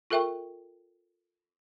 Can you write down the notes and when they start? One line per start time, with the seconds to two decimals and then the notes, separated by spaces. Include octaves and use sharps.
0.10 F4 A4 A#4 E5 G5 C#6